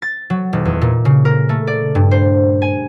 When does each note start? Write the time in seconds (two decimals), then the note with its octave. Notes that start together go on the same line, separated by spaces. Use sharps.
0.02 A6
0.30 F#3
0.53 D#1
0.65 E2
0.81 A#2
1.05 C#3
1.25 A#4
1.49 A3
1.67 D5
1.95 G2
2.11 C5
2.62 G#5